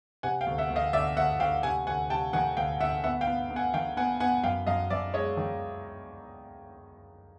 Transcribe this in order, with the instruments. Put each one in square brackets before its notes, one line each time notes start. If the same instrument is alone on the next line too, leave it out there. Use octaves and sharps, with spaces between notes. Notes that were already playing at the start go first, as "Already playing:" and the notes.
[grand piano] C3 F#5 G#5
F5 G5
D2
E5 F#5
D2
D#5 F5
D2 D5 E5
D2 E5 F#5
D2 F5 G5
C3 F#5 G#5
D2 F#5 G#5
C3 G5 A5
D#3 F#5 G#5
D2 F5 G5
D2 E5 F#5
B3 E5 F#5
F5 G5
B3
B3
F#5 G#5
D#3 F5 G5
B3 F#5 G#5
B3 F#5 G#5
F#2 F5 G5
F#2 D#5 F5
F#2 D5 E5
G#3 C#5 D#5
D#3